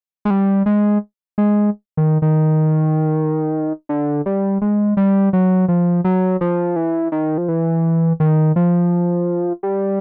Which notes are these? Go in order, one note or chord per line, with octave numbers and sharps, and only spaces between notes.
G#3
G3
G#3
G#3
D#3
D#3
D3
G3
G#3
G3
F#3
F3
F#3
F3
E3
D#3
F3
E3
D#3
F3
G3